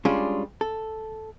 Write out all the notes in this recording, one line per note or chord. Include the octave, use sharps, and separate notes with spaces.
G3 G#3 C#4 D4 F4 G#4
A4